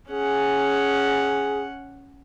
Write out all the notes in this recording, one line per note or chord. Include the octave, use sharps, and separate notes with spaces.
C#4 G#4 F#5